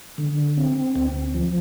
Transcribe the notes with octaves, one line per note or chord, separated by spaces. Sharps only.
D3
C4
D2
F3